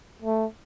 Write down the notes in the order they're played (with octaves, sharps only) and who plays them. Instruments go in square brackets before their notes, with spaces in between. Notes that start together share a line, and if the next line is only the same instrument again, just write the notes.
[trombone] A3